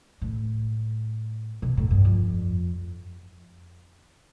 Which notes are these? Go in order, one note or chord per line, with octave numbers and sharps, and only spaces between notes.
A2
B2
A2
G2
F2